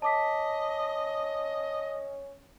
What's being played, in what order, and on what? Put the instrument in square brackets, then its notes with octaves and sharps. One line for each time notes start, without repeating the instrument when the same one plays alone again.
[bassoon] C#4 [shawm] D#5 [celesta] A5 D6 B6